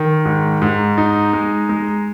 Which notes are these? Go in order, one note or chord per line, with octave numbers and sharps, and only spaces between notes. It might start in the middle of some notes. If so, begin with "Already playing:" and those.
Already playing: D#3
G#2
G#2
D#4
G#3
G#3